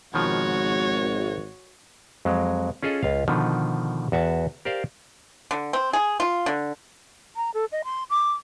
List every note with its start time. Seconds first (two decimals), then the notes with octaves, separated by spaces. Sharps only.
0.14 G#1 B2 D#3 F3 F#4 C#5
2.25 F2 F#3 G#3
2.83 C#4 F4 G#4 A4 D#5
3.03 C#2 F4 F5
3.28 B2 D3 D#3 F3
4.12 E2 F#4 E5 A5
4.65 G4 A#4 C5 D5 F5
5.51 D3
5.73 C4
5.93 G#4
6.20 F4
6.46 D3
7.36 A#5
7.54 A4
7.72 D#5
7.84 C6
8.10 D6